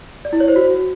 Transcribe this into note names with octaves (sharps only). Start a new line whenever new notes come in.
D5
E4
C#5
C5
F#4